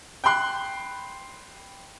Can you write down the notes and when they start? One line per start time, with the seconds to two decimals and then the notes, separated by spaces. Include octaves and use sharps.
0.24 G5 B5 C6 F#6